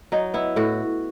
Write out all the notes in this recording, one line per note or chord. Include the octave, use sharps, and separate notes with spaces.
F#3 D#4
B3 E4
A2 F#4